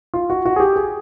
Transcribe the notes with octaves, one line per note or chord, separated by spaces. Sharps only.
F4
F#4
F#4
G#4
G4
G#4